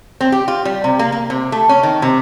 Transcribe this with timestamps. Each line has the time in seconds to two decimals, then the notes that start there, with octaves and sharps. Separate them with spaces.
0.20 C4
0.32 G4
0.48 F4
0.65 G3
0.84 C3
0.99 A#3
1.12 A#3
1.30 C3
1.52 A3
1.69 C#4
1.83 D#3
2.02 C3